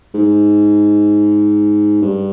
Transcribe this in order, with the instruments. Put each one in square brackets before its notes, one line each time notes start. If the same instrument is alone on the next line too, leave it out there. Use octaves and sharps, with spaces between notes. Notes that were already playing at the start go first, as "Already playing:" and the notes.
[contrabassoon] G#2
G2